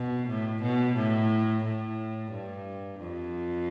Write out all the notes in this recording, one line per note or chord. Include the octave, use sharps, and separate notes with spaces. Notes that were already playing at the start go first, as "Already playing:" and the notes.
Already playing: B2
A2
B2
A2
A2
G2
F2